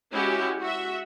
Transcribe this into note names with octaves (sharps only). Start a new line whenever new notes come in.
G#3 C#4 E4 F#4 G4
F#4 E5